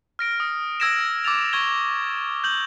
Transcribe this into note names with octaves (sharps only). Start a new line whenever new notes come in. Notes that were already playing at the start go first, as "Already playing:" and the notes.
F6 A#6 D7
D#6
E6 G#6 A#6 D7 E7
D6 E6 A6 F7
C#6 G#6 G7
G6 F#7